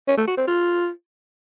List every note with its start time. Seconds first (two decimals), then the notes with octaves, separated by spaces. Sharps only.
0.08 C#4
0.17 A3
0.27 F#4
0.37 C4
0.47 F4